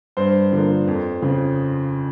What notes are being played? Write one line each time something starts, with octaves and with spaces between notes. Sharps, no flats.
G2 C5
D3 F3 A#3
F2
C#3 F3